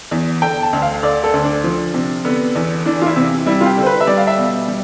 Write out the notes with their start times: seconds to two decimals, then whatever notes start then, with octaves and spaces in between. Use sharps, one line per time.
0.11 E2
0.42 D3 G5
0.62 A5
0.73 D2
0.82 F5
1.03 D3 D5
1.24 A4
1.34 D2
1.44 D4
1.64 F3
1.94 C3
2.25 D3 B3
2.55 E2
2.86 E3 D4
3.02 F4
3.06 E4
3.16 C3
3.46 G3 E4
3.61 F4
3.67 G4
3.77 D3
3.83 C5
3.87 B4
4.00 E5
4.07 G3 D5
4.17 F5
4.27 E5
4.38 B2
4.68 G3